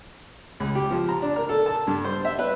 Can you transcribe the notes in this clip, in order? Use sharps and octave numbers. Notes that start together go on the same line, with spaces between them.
C#2
G4
F3
A#5
D4
A#4
A4
A5
G2
C5
E5
B4